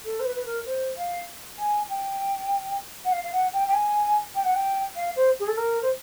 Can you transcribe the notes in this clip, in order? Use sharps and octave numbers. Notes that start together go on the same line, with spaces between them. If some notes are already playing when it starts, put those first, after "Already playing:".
A4
C5
B4
B4
A#4
C5
F5
G#5
G5
F#5
F5
F5
F#5
G5
G5
G#5
G5
F#5
G5
F5
C5
G#4
A4
A#4
C5